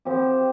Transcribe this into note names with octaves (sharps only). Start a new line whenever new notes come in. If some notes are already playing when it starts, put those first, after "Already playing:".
F3 C4 G4